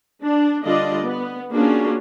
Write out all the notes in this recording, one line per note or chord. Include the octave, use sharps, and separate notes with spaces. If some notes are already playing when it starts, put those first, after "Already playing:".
D4
D3 G3 D4 F4 D5 D#5
B3
A#3 C#4 D4 F4 F#4 G#4